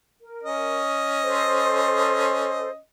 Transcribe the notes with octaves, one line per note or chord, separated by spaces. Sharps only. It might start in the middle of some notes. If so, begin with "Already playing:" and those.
A#4
C#4 D#5
A4 C5